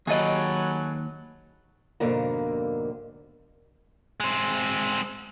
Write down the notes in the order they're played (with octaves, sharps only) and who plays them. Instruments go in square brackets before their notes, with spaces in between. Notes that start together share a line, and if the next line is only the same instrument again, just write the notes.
[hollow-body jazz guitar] D#2 D#5 [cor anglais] F#3 [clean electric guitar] G#4 A4 B4
[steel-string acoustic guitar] F2 G#2 B2 D3 A#3
[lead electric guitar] G#3 C4